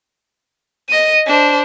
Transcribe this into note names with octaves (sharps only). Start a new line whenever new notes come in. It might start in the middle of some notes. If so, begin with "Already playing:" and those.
D#5 D#7
D4 C5